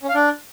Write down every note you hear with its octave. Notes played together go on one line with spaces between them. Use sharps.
C#4
F5
D4